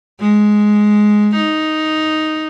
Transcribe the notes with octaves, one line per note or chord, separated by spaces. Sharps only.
G#3
D#4